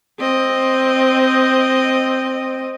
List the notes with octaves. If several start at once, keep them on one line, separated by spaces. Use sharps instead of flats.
C4 D#5